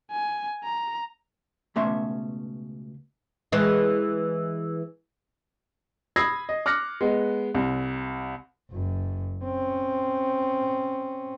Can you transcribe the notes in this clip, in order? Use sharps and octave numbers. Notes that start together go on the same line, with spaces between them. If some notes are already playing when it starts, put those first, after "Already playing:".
G#5
A#5
C#2 B2 A3 C#4 E5 C6
E3 G#3
B5 D#6 E6 G#6 A#6 C7
D#5
D6 F6 F#6 A#6 C#7
G#3 B3
C2
F#1 F#2
C4 C#4